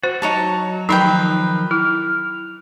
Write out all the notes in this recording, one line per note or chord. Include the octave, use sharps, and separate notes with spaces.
F#4 C5
F#3 D#4 C#5 A5
D#3 F3 F#3 D#4 A#4 B4 G5 B5
E4 F6